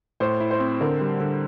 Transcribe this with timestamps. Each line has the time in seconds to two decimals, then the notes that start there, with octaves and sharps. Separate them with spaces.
0.20 A2 C5
0.40 E4
0.51 C5
0.60 C4
0.81 D3 A#4
1.01 G3
1.21 D3